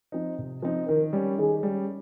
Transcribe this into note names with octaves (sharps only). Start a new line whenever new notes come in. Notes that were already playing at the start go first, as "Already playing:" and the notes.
F3 C4 D#4
C3
F3 C4 D#4
D#3 A#4
G3 C#4
D#3 G#4
G3 C#4